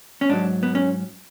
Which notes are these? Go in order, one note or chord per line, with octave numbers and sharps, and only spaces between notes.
C#4
G#2 F#3 D4
B3
C#4